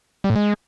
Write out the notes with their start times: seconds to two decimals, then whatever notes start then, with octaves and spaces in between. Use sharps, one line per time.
0.24 G3
0.30 A2
0.36 G#3